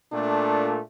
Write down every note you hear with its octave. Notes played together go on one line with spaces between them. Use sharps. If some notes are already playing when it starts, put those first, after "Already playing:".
A#2 A3 D4